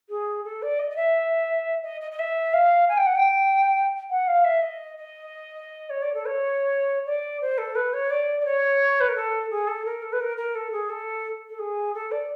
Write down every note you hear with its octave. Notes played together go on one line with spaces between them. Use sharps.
G#4
A4
D5
D#5
D#5
E5
D#5
D#5
D#5
E5
F5
G#5
G5
F#5
G5
F#5
F5
E5
D#5
D#5
C#5
D5
A4
C#5
D5
C5
A4
B4
C#5
D5
D5
C#5
B4
A#4
A4
G#4
A4
A#4
A4
B4
A#4
A#4
A4
G#4
A4
A4
G#4
A4
D5